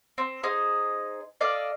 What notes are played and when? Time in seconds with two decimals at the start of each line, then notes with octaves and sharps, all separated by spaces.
0.18 C4
0.43 D#4 G#4 C5
1.41 A4 D5 D#5 F5